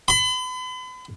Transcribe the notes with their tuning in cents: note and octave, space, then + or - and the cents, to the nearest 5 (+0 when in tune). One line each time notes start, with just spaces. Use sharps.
B5 +40